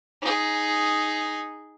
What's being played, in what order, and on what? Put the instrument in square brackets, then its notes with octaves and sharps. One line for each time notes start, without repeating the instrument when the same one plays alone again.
[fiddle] D#4 G#4